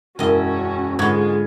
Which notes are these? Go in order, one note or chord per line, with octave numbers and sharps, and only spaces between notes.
E1 F#2 C#4 E4 F#4 D#5
G#2 D3 G#3 F4 B5 C#6 G#6